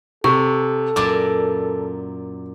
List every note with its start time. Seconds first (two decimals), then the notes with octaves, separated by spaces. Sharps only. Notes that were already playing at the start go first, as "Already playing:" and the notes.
0.24 C3 A4 C#6
0.96 F#2 A#2 D5 D6